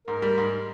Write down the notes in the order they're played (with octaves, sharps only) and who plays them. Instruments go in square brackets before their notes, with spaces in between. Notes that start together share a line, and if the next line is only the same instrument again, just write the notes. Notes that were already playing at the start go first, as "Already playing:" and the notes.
[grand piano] G#2 [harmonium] A#4
[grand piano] G3
G#2